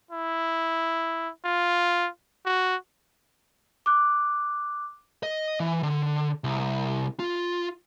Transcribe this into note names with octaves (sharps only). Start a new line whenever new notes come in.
E4
F4
F#4
D6 F#6
D#5
E3
D3
C2
F4